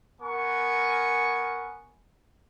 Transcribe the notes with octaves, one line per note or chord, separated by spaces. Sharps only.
B3 A#4 G#5 C#6